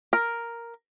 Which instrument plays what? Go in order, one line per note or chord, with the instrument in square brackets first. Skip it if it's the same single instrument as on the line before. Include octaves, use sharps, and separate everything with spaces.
[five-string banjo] A#4